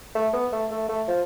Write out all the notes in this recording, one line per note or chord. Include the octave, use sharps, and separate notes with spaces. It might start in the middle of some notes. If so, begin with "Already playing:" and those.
A3
B3
A3
A3
A3
F3